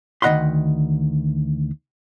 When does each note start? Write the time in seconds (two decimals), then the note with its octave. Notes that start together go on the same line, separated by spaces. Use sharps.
0.22 D2 D#3 D#5 F#5 B5 C6